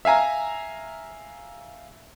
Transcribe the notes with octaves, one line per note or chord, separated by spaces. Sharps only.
E5 F5 G#5 A#5